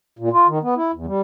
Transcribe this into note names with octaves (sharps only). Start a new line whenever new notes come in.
A#2
F4
D#3
B3
E4
E2
G3